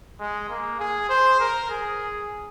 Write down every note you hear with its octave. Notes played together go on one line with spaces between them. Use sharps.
G#3
A#3
G#4
C5
A#4
G#4